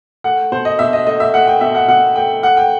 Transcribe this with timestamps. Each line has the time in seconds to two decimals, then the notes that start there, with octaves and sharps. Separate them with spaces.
0.24 A3 F#5
0.52 B2 C5
0.65 D#5
0.79 B2 E5
0.93 D#5
1.07 A3 D#5
1.20 E5
1.34 A3 F#5
1.47 G5
1.61 B2 E5
1.75 F#5
1.88 B2 F#5
2.16 A3 G5
2.43 A3 F#5
2.57 G5